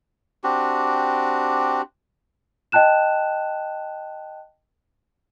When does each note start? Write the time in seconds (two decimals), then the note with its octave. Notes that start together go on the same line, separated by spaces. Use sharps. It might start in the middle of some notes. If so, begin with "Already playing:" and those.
0.44 C4 D4 F#4 G4
2.72 D#5 G5 A5 F#6 E7